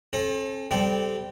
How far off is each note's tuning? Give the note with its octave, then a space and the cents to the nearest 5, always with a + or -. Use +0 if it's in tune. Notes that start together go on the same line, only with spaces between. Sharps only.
C4 +45 A4 -25
G3 +0 C4 -20 A4 -15